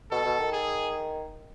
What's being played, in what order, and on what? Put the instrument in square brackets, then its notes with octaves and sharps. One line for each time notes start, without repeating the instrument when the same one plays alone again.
[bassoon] B2 [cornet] A4
[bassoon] B2
D#3
[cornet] G#4